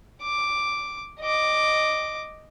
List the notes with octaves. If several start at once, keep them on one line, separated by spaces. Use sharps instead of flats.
D6
D#5 D6